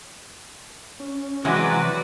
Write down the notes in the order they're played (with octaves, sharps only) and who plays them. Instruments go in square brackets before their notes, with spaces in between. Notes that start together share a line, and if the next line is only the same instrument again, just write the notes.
[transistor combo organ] C#4
[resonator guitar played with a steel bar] C3 F#3 G#3 [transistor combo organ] E3 [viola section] F#4 B4 D5